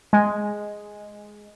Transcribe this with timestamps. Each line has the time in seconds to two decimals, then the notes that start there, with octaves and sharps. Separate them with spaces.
0.13 G#3